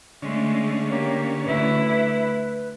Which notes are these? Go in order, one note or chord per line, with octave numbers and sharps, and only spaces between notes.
D3 G#3 A3 C#4
A#3 G4 C#5
D2 E4 B4